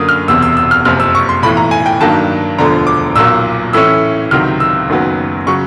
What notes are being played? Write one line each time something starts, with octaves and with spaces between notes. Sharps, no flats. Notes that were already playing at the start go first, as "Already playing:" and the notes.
Already playing: F#2 D3 F#3 A#3 D#6
F6
E1 E2 C3 E6
E6
E6
F6
F#1 F2 C3 F6
E6
C#6
C6
B1 A2 E3 B5
A#5
G#5
G5
G2 D#3 F#3 A#3 A5
E1 D2 D3 F3 A#5
D6
B1 A#2 F#3 A#3 E6
A2 E3 A3 C#4 E4 E6
C#2 C3 D#3 F#3 F6
E6
F#1 F#2 D#3 F#3 B3
C#3 F#3 C#6